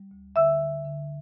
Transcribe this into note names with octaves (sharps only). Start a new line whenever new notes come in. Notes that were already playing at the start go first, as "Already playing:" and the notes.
Already playing: G3
D2
D3 E5 E6
D3
D3